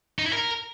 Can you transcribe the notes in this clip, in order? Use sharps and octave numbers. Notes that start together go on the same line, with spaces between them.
D#4
E4
A#4